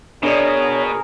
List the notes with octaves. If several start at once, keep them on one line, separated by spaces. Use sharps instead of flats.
B2 D4 G#4 A#4 C#5 D5